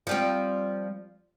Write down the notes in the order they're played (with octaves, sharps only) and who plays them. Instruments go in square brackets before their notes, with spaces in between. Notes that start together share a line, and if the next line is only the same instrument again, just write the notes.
[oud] F3 G3 C4